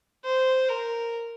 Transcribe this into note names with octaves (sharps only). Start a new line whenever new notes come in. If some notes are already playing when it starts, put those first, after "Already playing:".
C5
A#4